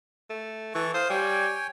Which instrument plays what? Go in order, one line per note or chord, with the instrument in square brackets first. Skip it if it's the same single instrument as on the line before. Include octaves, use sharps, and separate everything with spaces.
[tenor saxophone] A3
[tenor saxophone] E3 [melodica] A4 C#6
[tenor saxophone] C5 [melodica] F5 D#6
[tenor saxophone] G3 [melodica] C#5 G5 G#5